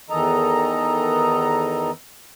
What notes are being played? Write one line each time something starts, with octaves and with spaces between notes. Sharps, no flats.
E2 D#3 E3 A4 D#5 A#5